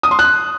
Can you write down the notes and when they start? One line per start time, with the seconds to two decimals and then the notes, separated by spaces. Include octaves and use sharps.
0.03 D#6
0.11 C6
0.19 F#6